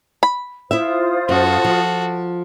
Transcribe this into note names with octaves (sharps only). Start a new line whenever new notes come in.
B5
E4 F4 C5 E5 D#6
F#2 F#4 A4
F3